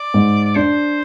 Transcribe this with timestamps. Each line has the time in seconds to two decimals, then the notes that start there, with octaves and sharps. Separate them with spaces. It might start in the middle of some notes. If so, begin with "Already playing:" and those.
Already playing: D5
0.14 G#2
0.44 D5
0.56 D4 C5